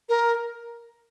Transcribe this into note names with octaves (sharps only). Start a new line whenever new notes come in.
A#4